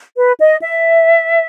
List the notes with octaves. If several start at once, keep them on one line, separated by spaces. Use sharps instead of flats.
B4
D#5
E5